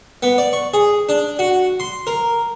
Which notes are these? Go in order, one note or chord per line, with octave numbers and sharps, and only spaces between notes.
B3
D5
C#6
G#4
D4
F#4
C6
A#4